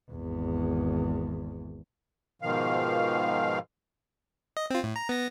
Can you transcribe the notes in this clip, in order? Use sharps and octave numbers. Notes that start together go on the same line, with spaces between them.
G#1 E2
G#2 B2 D#3 F3 F5
D#5
C4 F4
A2
A#5
B3 A#6